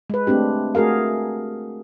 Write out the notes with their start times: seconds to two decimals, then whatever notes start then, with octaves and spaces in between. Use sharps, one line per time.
0.10 G#3 B4
0.27 A3 C4 D4 G4
0.75 A3 F#4 G#4 A#4 F5